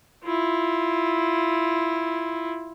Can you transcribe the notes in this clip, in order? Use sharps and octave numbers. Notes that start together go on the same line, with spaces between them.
E4 F4